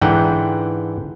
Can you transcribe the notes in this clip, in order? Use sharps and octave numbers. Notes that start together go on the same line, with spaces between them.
G#2 D3 E3 F#5 G5